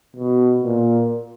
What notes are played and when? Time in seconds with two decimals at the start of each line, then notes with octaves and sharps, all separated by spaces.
0.16 B2
0.64 A#2